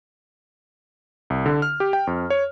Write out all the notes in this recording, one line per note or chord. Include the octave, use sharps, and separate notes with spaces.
C2
D3
F6
G4
G5
F2
C#5